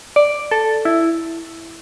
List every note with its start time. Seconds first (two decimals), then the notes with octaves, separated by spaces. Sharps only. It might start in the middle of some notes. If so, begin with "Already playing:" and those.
0.16 D5
0.51 A4
0.85 E4